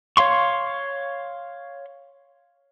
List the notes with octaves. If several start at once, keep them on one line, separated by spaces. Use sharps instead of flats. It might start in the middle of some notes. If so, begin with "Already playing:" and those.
C#5 F5 C6 C#6